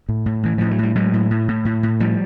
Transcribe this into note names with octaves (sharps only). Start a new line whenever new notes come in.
A2
A2
A2 E3
A2 F3
F#3
A2 G3
A2 F#3 G#3
A2
A2
A2
A2
A2
A2 F3 G3